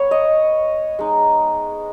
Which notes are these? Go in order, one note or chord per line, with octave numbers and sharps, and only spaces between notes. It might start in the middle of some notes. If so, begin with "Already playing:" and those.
Already playing: B3 C#5
D#5
G#3 D#4